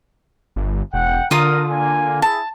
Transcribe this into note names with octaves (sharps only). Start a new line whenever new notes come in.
G1
E1 F#5 G5
D3 F4 A#4 D#6
A#3 G#5
E4 G#4 A5